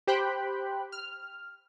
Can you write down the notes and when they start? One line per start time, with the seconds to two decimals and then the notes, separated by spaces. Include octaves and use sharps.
0.07 G4 C5 G5 B5 F#6
0.92 F6